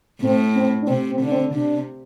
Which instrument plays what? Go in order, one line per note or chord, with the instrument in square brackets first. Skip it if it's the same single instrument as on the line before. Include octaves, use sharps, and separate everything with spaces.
[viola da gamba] A2 [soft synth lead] C4
[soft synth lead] C4
D4
[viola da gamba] C3 [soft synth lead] C4
[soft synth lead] C4
[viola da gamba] D3
[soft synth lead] D4
C4
[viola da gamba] C3 [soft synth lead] D4